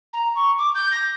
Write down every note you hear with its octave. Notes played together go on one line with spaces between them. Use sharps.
A#5
C#6
D6
G6
A#6